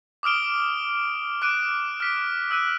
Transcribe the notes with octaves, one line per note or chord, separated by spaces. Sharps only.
D6 D#6 F6 D7 G7
D6 F#6 D7 D#7
F6 B6 D7
E6 F#6 D#7